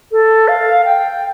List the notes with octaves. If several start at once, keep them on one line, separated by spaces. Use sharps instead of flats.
A4
F5
G5